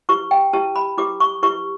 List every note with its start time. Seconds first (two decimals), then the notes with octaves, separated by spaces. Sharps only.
0.09 E4 G4 B4 C#6
0.31 G5
0.53 E4 G4 B4 A5
0.76 B5
0.98 E4 G4 B4 D6
1.20 C#6
1.43 E4 G4 B4 C#6